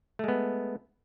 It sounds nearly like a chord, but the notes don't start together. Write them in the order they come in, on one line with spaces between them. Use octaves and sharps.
A3 G#3 B3